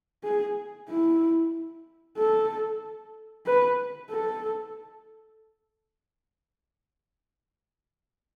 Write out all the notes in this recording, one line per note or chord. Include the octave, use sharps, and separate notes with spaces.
G#4
E4
A4
B4
A4